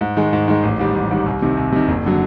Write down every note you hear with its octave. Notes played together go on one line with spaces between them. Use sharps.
G#2
D#3 G#3
G#2
D#3 G#3
A1
G#2 D#3 G3
A1
G#2 D#3 G3
C2
C3 D#3
C2
C3 D#3
F#1
D3 F#3